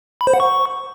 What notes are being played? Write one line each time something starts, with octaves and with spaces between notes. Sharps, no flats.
B5
C5
F#5
C#6